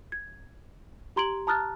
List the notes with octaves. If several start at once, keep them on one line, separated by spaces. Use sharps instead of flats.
G#6
G4 A#5 C6 G#6 D7 F#7
A5 A#5 D#6 F6 F#6 A6